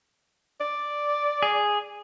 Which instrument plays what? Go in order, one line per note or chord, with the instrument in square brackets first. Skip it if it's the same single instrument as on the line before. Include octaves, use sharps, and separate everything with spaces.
[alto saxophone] D5
[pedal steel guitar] G#4